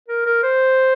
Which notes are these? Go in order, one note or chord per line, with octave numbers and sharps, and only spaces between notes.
A#4
A#4
C5